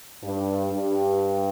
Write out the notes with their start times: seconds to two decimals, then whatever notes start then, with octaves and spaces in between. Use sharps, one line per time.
0.23 G2
0.71 G2